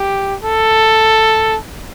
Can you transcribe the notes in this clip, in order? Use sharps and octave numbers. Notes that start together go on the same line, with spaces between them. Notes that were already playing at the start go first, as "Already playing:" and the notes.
Already playing: G4
A4